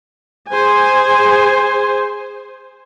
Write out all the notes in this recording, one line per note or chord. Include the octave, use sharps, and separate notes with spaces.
G#4 C5 G#5